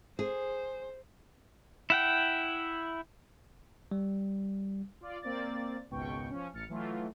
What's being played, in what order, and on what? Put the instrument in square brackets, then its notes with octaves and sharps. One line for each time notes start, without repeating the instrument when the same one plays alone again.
[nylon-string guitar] G#4 [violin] C5
[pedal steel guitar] E4 F#5 G5
[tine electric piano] G3
[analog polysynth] F4 D5
A#3 C4 D5 A6
G#1 C#2 B2 G5 C#6
F3 C#4
A1 F6 A6 C#7
E3 F#3 A3 F4